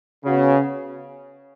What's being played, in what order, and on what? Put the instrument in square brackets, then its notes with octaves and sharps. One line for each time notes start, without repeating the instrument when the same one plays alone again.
[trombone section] C#3 [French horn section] B3 F#4 C#5